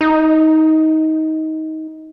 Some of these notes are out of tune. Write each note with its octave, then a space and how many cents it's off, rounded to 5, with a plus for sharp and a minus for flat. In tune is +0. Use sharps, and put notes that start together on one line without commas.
D#4 +20